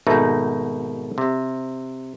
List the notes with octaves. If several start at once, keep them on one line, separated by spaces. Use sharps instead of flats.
G#1 B2 A3 D#4
C3